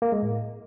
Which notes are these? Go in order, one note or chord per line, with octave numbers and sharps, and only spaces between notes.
A#3
G#3
A2